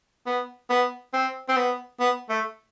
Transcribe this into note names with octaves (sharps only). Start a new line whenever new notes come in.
B3
B3
C4
C4
B3
B3
A3